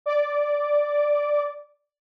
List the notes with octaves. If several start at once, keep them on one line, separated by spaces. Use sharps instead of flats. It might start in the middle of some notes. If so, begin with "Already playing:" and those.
D5 D6